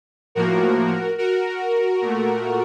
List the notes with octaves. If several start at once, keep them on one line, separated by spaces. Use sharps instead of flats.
A2 F3 A#3 F#4 A#4
F#4 A#4
A#2 A3